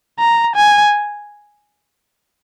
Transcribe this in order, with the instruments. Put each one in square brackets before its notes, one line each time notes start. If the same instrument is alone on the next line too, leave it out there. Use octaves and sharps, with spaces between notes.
[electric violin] A#5
G#5